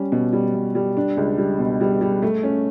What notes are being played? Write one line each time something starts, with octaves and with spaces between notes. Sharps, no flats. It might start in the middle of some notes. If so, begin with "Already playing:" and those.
Already playing: G3 C#4
B2
G3
B2
G3
D4
C#2
G3
B2
G3
G3
A3
C#4